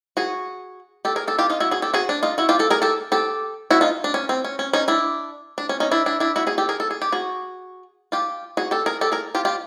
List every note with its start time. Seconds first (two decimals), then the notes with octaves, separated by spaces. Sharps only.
0.17 F#4 G#4
1.05 G4 A4
1.16 G#4 A#4
1.27 G4 A4
1.39 F4 G4
1.50 D#4 F4
1.60 E4 F#4
1.71 F#4 G#4
1.82 G4 A4
1.94 F#4 G#4
2.09 D4
2.23 D#4 F4
2.38 E4 F#4
2.49 F4 G4
2.59 G4 A4
2.70 G#4 A#4
2.82 G4 A4
3.12 G4 A4
3.71 E4 F#4
3.81 D#4 F4
4.04 D4
4.14 C#4
4.29 C4
4.44 C#4
4.59 C#4
4.73 C#4 D#4
4.88 D4 E4
5.58 D4
5.69 C#4
5.80 C#4 D#4
5.91 D4 E4
6.06 D4 E4
6.20 D4 E4
6.36 E4 F#4
6.47 F#4 G#4
6.58 G4 A4
6.69 G#4 A#4
6.80 A4
6.91 G#4
7.02 G4
7.12 F#4 G#4
8.12 F4 G4
8.57 F#4 G#4
8.71 G4 A4
8.86 G#4 A#4
9.01 G4 A4
9.12 G#4 A#4
9.35 F4 G4
9.45 F4 G4